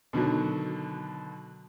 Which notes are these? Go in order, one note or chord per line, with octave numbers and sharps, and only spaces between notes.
B2 D3 D#3 F#3